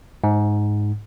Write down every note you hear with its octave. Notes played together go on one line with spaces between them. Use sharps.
G#2